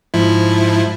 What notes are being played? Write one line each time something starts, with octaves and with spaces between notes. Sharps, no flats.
G#2 F3 E4